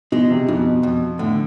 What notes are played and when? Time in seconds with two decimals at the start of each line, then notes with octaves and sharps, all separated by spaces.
0.12 B2 G#3
0.31 C3
0.48 F2 B2
0.83 F2
1.19 A2 D3